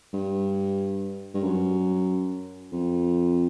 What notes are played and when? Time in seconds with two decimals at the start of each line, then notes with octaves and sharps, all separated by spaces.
0.14 G2
1.34 G2
1.43 F#2
2.73 F2